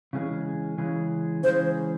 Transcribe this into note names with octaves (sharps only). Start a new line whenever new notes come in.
C#3 E3 G#3 C#4 G#4
C#3 E3 G#3 C#4 G#4
C#3 E3 G#3 C#4 G#4 C5